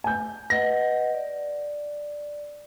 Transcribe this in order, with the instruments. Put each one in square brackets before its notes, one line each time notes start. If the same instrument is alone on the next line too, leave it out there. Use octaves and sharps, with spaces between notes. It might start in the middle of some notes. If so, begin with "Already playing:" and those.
[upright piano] G#5 G6
[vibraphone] B4 D#5 F#5 [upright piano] A#6
[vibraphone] D5